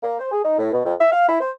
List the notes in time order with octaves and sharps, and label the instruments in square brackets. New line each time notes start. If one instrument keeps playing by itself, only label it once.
[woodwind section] A#3
C5
G#4
D#4
A2
B2
F2
E5
F5
E4
C5